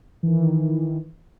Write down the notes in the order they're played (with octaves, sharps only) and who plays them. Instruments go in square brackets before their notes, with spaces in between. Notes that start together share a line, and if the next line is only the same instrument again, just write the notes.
[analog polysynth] D#3 E3